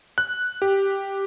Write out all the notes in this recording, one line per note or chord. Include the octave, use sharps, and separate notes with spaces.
F#6
G4